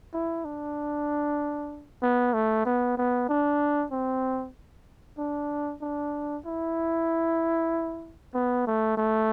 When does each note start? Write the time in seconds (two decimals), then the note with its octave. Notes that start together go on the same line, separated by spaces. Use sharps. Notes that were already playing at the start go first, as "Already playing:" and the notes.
0.13 E4
0.45 D4
2.02 B3
2.34 A3
2.65 B3
2.97 B3
3.29 D4
3.92 C4
5.18 D4
5.81 D4
6.46 E4
8.34 B3
8.67 A3
8.97 A3